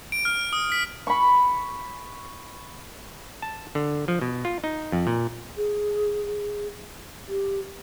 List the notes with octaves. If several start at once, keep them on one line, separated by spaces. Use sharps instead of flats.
D7
F6
D#6
B6
B5 C#6
A5
D3
F3
B2
F4
D#4
F2
A#2
G#4
G4